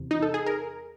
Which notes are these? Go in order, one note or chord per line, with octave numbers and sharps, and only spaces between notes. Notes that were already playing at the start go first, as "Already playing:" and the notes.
Already playing: E2 C3
D#4
A4
G#4
A#4